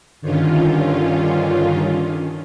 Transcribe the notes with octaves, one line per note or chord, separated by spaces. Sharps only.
G2 D3 D#3 C#4 F4